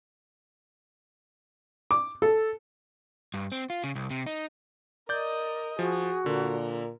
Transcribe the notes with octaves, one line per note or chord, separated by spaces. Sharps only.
D6
A4
G2
C4
F4
C#3
C2
C3
D#4
A#4 D5 D#5 G6
F3 F#4 G#4
A#2 D3 A#4